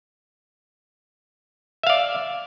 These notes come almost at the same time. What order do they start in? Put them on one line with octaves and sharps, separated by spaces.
E5 F5 D5